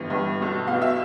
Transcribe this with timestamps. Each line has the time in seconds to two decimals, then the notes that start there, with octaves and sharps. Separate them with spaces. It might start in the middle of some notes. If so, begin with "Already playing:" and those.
Already playing: G1 G2 E3
0.10 G1 G2 E3
0.39 B1 B2
0.67 B1 B2 F5
0.82 E5